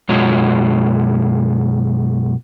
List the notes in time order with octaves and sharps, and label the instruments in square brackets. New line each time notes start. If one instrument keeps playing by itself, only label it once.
[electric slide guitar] F#2 B2 G#3 F4 C#5